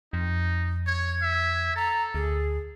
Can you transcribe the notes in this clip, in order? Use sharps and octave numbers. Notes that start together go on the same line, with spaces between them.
F2 D#4
C#5 G#6
E5
A4 A#5
D2 G#4